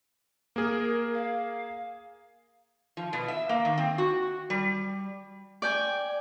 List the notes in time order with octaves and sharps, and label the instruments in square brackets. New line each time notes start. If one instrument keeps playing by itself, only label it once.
[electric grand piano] A#3 G#4 [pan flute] A#4
[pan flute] F5
[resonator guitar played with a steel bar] F3
B2
E5
A#3
D#3
C4
F#4
G3
[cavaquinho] D5 G5 G#5